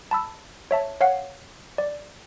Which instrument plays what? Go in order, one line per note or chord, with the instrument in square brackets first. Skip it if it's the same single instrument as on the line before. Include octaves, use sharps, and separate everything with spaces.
[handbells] A5 B5 E6
C#5 E5 A5
C#5 F5 F#5 C7
D5